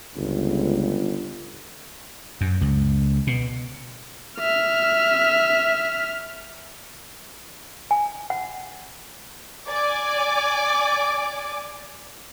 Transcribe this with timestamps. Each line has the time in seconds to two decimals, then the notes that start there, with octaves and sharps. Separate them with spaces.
0.17 G1 C#2
2.41 F#2
2.61 C#2
3.27 B2
4.38 E5 F6
7.91 G#5
8.30 F#5
9.69 D5 G#5 D6